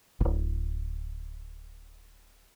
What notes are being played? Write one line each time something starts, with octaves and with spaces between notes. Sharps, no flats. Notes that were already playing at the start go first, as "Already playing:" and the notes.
D1 G1